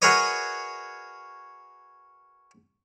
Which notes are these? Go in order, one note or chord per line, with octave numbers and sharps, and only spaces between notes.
F#4 G#4 A#4 B4 C#5 D#5